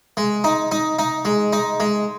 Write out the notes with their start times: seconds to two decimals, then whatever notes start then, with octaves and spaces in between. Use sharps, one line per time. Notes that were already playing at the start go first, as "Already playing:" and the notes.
0.17 G#3
0.44 D#4
0.71 D#4
0.99 D#4
1.25 G#3
1.53 D#4
1.80 G#3